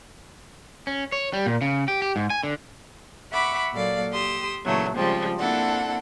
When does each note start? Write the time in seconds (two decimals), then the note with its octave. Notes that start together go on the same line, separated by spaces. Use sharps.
0.87 C#4
1.12 C#5
1.33 G3
1.46 A#2
1.61 C#3
1.88 G4
2.02 G4
2.16 G#2
2.30 G#5
2.43 D3
3.31 E5 F#5 B5 C#6 D6
3.73 A#2 F#3 A#3 A4 D5 F5
4.12 G4 C6 D#6 E6
4.65 A#2 C#3 E3 F#3 A3
4.96 C#3 F3 G3 G#3 C4
5.39 A#3 C4 D4 E4 A4 F#5